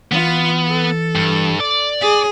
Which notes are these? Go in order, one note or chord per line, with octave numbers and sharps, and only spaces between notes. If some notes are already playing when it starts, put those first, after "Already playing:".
E3 B3 F4 F5
A4
G2
D5
G#4